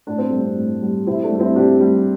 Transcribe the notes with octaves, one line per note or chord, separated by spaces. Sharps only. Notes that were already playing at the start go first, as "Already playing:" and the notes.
A2 D4
C4
G3 A3
C4
A2
G3
C3 C4 E4
A3 D4
G3
C4 E4
C3 D4 G4
G3